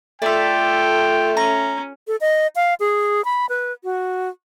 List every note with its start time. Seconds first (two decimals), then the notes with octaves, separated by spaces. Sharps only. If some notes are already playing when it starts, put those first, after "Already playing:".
0.22 A3 F4 A4 D5 E5 G5
1.37 C#4 A#5
2.07 A4
2.21 D#5
2.56 F5
2.80 G#4
3.25 B5
3.49 B4
3.84 F#4